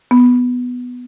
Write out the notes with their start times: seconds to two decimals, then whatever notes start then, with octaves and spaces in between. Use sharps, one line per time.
0.11 B3